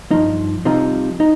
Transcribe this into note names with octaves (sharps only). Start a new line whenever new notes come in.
G2 F3 D#4
C2 C3 F3 C4 D#4
D#4